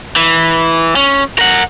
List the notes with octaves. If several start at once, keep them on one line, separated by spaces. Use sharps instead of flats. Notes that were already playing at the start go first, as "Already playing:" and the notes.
E3
C#4
A#4 F#5